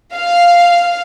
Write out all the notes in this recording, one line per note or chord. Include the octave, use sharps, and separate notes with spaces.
F5